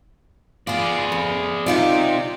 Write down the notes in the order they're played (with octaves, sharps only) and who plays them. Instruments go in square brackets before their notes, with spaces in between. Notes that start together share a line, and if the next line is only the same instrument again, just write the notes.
[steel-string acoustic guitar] B3 F4 [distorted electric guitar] G#4 D5
[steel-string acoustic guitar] F2
[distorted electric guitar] C3 [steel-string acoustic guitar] D#4 F4 D5